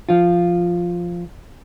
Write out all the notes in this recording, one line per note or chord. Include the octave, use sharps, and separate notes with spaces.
F3 F4